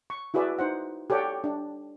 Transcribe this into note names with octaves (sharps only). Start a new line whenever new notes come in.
C#6
E4 F#4 G#4 B4 D5 E5
D#4 C5 F#5
G4 A4 C#5 D5 F#5 G5
D4